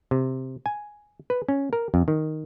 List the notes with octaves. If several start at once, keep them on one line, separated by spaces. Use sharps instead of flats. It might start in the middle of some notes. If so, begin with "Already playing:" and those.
C3
G#5
B4
C#4
A#4
F2
D#3